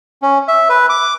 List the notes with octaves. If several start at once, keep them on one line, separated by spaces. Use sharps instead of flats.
C#4
E5
B4
D6